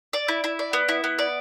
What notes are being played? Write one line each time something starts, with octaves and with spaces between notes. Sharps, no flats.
D5
E4
E4
D5
B3
E4
B3
D5